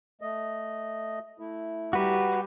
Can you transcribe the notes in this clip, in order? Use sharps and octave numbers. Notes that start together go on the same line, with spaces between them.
A3 D#5
A3 E4
G3 F#4 B4 A#5